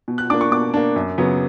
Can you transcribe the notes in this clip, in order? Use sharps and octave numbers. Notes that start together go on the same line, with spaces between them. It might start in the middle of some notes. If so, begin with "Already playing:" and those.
B2
F#6
A#3 D4 D6
C#6
B2 D6
A#3 D4
F#2
C#3 F#3 B3